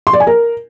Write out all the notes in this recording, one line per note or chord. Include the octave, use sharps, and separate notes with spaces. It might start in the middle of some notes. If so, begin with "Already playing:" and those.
C6
D5
G#5
A#4